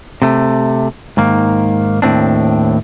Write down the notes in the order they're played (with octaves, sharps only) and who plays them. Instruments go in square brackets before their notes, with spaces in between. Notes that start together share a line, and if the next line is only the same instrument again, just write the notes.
[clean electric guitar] C3 A3
G#2 D#3 A#3
D#2 A2 C4 D4